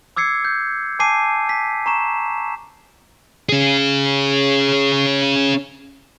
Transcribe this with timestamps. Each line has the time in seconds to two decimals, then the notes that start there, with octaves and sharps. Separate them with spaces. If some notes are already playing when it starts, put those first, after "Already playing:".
0.16 D6 E6 G#6 C7 C#7
0.45 G6
0.99 G#5 A5 D6 C7 D#7
1.49 B6
1.86 A#5 C#6 E7
3.49 C#4 G#4